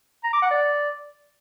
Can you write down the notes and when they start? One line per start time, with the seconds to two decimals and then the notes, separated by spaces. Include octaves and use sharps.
0.24 A#5
0.33 D6
0.42 F#5
0.51 D5